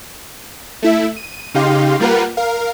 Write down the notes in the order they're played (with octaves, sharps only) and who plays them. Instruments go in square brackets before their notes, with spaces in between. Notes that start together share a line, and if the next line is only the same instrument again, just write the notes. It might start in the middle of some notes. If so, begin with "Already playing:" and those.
[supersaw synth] A3 E4 E5
D#7
C#3 D#4 G4 F5 C6
G3 A#3 F4 A#4 B4 F#5
A#4 F5